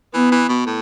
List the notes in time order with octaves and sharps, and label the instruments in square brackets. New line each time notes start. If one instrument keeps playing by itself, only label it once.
[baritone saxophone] E3 [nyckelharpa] B3
[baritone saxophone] E3
B2
A2